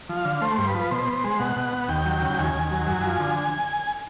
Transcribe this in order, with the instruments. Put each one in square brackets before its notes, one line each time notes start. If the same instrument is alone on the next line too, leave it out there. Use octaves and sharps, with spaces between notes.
[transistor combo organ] F3
F5
D3
A3 C5
G2
B4
F3
B2 C5
B3
G#3
B2 F#5
B2
B3
D#2 G5
F#3
C#3
D#2 G#5
D#2
F#3
F#2
F3
D3